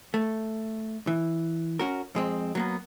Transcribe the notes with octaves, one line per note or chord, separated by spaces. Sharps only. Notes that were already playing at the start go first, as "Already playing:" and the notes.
A3
E3
C#4 F#4 A#4
F2 G#3 C4
F#3 A#3 B3